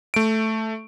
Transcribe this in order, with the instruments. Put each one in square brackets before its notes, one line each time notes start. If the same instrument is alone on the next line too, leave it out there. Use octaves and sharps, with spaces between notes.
[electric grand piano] A3 D7